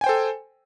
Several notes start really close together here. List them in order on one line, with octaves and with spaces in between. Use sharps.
G#5 G5 C5 A4